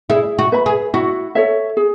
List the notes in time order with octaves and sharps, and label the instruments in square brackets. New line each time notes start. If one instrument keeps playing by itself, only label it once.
[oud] E4 [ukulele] G#4
[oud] F#4
[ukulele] B4 E5 B5
[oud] G#4
[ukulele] E4 [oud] F#4
[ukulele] A4 C#5 E5
G#4